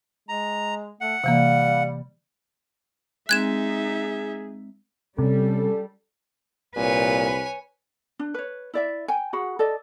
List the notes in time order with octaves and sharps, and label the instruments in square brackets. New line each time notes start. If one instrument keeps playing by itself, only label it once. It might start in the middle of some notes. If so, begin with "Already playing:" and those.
[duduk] G#3 [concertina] A#5
[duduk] A3 [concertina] F#5
[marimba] C3 E3 A#3 [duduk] G3 [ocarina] F5
[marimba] G#3 C4 [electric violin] D#4 E5 [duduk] G#4 [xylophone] F#6 G#6 E7
[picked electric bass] C3 [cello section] G3 [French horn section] C#4 A4
[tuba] C2 [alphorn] A#2 [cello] B4 [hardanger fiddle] C#5 G#5
[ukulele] D4
B4 C#5
E4 D5 E5
G5 G#5
F#4 G#4 F#5 B5
A4 D5 D#5